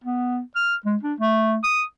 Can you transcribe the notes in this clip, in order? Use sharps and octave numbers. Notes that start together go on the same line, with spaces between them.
B3
F6
G#3
D4
A3
D#6